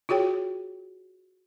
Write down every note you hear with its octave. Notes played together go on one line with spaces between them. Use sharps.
F4 F#4 G#4 C#5 G5